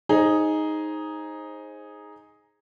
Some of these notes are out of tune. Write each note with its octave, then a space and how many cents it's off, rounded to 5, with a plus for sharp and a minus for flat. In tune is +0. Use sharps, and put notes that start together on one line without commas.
D#4 +5 G#4 +0 C5 +25